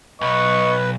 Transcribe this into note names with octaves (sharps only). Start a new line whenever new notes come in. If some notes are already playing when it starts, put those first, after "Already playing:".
B1 B4 D#5 C#6